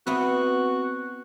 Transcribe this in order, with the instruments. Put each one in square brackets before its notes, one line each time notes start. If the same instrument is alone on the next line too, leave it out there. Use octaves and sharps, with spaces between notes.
[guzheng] B3 E4 B4 [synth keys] C4 [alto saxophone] F#4